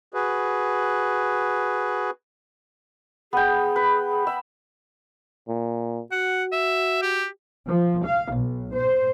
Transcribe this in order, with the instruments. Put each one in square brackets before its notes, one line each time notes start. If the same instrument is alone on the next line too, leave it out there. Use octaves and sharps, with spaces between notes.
[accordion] F#4 G#4 B4
[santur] B3 G5 [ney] G#4
[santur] B4
[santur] E5 [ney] B5
[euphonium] A#2
[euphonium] F#4 [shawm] F#5
[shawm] E5
G4
[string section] F3
F5
B1
C5